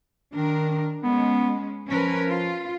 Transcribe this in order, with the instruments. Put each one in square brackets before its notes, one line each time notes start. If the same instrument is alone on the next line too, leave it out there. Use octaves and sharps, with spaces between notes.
[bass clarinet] D#3 [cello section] D4 A#4
[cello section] G#3 C#4 [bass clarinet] B3
[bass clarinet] F3 [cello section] C#4 A#4 B4
[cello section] F4